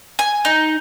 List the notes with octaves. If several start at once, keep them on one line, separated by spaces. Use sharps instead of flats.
G#5
D#4